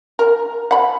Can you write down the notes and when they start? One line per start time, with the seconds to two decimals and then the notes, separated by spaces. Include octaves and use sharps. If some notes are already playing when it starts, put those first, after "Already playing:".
0.19 A#4
0.71 F#5 B5